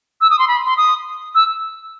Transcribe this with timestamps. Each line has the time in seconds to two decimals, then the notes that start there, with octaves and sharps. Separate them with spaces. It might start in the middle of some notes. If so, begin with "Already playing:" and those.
0.21 E6
0.30 D#6
0.39 C6
0.48 B5
0.66 C6
0.77 D#6
1.35 E6